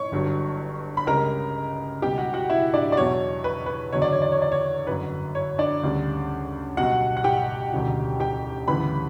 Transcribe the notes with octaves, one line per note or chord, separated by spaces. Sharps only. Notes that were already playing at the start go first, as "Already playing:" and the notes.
Already playing: C#5 C#6
G1 G2 F#3
B5
C#2 C#3 G3 A#4 A#5
C#2 B2 G3 G4 G5
F#4 F#5
F#4 F#5
E4 E5
D4 D5
D5
E2 B2 F#3 C#5
B4
B4
F#1 E2 D3 F#3 C#5
D5
C#5
D5
C#5
D5
C#5
G1 F#2 D3 B4
C#5
D4 D5
D2 C#3 G3
B1 B2 G3 F#4 F#5
F#5
G4 G5
E1 D2 C#3 F#3
G4 G5
D2 C#3 E3 G3 B4 B5